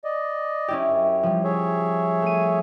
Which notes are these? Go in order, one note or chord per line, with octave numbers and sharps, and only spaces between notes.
D5 D#5
C#4 E4 G4
F#2
F3 G3
G#4 C#5 E5
A3 D#7